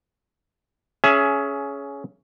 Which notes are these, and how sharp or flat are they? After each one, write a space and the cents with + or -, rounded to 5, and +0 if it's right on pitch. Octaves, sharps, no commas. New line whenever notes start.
C#4 +10 G#4 +20 E5 +20